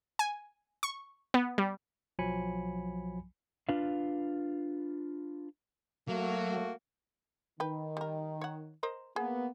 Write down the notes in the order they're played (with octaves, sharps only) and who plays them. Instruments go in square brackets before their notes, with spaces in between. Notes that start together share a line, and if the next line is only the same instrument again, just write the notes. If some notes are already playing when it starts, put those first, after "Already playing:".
[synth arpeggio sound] G#5
C#6
B3
G3
[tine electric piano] B1 F3 F#3 G#5 B5 C#7
[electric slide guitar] D4 F4 B4 F5
[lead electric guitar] F#3 [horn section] A3 A#3 F#4
[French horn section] D#3 [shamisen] B4 G5
[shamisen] G3 A#4
C#5 F#5
A#4 C5 D#5
[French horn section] A#3 B3 [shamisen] G#4